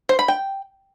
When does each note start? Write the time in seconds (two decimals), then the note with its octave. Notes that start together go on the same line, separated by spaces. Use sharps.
0.09 C5
0.19 B5
0.28 G5